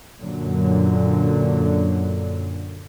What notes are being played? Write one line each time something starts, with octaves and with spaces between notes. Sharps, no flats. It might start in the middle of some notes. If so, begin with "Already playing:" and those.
F#2 A#2 D3 F#3